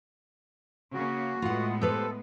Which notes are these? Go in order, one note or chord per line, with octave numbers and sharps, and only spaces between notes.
C#3 A#3 C#4 F#4
A2 G#3 B3 F4 F#5
G4 A4 B4 C5